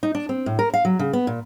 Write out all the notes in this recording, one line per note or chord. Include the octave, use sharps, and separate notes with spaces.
D#4
D4
C4
A2
A#4
F5
F#3
C#3
B3
A#2